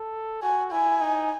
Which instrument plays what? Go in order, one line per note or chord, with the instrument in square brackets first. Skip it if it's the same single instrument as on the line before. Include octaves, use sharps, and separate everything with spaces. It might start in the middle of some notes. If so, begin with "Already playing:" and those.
Already playing: [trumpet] A4
[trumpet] F#4 [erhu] G#5
[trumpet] E4 [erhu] G#5
[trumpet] D#4